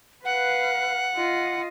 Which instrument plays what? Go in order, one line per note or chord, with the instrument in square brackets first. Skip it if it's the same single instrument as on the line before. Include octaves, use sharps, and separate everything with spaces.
[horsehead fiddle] B4 F5 [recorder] F#5
[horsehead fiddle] F4 D#5